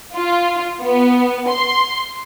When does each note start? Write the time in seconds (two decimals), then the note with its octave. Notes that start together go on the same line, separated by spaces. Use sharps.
0.16 F4
0.83 B3
1.49 C6